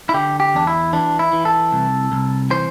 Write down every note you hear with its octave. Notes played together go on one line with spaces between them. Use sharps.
E4
D3 G4
G4
E2 D4
E4
E3 D4
E4
E3
A4
C2
C2
E3 C5